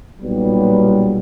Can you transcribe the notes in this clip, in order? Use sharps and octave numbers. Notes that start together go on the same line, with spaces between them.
B1 A#2 G3 B3